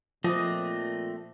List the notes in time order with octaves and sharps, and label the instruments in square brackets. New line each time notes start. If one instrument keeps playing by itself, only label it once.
[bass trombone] A#2 [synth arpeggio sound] F3 [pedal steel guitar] A3 C4 D#5 [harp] D6 D#6 F#6